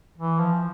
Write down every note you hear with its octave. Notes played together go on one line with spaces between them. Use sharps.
E3
F3